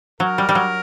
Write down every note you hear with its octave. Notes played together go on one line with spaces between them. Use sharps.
F#3 A#4
G3
G3
F#3